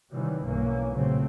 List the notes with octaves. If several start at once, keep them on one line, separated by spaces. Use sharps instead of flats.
C3 D#3 E3 F#3 G3
B1 G2 E3 A#3 C#4
A#2 C#3 F#3 A3 C4